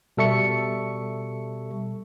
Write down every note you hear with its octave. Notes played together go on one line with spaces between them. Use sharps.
B2 G3 A4 E5 C#6 C#7